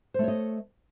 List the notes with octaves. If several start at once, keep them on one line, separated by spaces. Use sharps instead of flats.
A3 C5 C#5 D#5